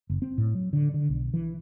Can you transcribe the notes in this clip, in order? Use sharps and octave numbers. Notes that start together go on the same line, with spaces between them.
F#1
C4
A2
F#3
D3
D3
B1
E3